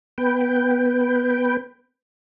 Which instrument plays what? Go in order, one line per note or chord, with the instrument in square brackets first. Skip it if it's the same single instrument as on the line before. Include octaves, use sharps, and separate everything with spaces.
[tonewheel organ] B3 B4 G5